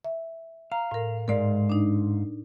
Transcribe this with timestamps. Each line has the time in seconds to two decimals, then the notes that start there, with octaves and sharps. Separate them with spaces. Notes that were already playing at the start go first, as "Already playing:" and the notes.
0.04 E5
0.72 F5 A#5
0.91 A2 A#4
1.28 G#2 G#3 A#4 D5 F5
1.70 D4 D#4